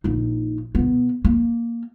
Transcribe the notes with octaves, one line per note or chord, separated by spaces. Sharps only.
A#1 D#4
B2 B3
A#3